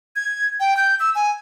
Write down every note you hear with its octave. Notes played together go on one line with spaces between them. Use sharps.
G#6
G5
G6
E6
G#5